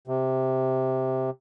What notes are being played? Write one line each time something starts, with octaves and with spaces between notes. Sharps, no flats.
C3